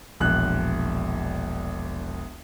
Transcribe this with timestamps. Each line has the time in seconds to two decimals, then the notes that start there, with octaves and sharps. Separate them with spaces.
0.20 E1 A#1 F#6